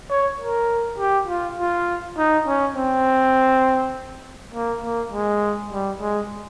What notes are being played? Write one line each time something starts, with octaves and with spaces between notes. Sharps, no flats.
C#5
A#4
G4
F4
F4
D#4
C#4
C4
A#3
A#3
G#3
G3
G#3